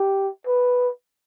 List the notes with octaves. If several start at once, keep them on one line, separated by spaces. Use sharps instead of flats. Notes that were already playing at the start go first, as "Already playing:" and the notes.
Already playing: G4
B4